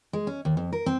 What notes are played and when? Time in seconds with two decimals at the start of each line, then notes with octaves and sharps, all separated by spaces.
0.13 G#3
0.27 C#4
0.45 D#2
0.57 F2
0.73 A#4
0.86 C4